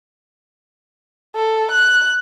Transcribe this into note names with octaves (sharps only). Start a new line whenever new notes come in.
A4
F#6